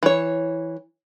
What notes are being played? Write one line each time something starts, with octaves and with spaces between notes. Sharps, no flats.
E3 C#5